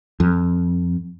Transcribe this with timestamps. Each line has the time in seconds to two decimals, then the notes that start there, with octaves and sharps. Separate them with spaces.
0.20 F2